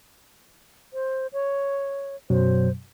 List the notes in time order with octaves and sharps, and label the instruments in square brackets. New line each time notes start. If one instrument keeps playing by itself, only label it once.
[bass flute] C5
C#5
[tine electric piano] F#2 B2 F#3 [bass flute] C5